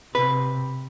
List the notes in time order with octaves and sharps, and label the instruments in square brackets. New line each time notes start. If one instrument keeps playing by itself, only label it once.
[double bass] C3 [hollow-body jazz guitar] B4